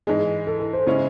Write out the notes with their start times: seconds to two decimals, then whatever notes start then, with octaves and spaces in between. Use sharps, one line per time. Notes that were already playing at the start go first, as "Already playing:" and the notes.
0.07 G#2 E3 G#3 G#4
0.47 A4
0.60 A4
0.73 C5
0.86 C#3 G#3 C#4 E4